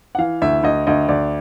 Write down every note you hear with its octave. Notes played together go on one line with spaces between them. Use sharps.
F#5
E3 F5
D2 E5
D2 D#5
D2 D#5
D2 D5